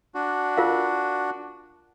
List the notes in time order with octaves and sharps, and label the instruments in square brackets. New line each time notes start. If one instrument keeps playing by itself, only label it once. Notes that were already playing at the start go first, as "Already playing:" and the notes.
[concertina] D4 F#4
[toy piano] F4 A#4 F5